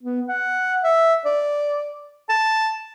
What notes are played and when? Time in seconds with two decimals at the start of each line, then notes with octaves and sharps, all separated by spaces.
0.03 B3
0.29 F#5
0.83 E5
1.25 D5
2.29 A5